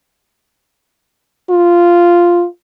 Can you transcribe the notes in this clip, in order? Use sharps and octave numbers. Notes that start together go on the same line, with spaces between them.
F4